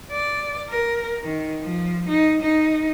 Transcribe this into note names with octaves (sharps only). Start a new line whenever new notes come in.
D5
A#4
D#3
F3
D#4
D#4